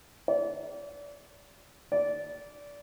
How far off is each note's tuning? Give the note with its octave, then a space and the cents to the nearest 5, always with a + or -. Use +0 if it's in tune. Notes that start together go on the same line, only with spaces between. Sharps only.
D5 -35
D5 -20